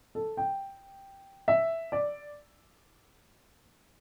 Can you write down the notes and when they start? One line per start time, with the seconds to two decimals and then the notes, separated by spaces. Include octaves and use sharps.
0.15 A4
0.37 G5
1.48 E5
1.92 D5